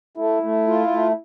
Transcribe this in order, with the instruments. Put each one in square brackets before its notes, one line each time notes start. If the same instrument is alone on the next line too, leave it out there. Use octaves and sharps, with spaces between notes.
[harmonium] A3 [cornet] E4
[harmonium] A3
F4
A3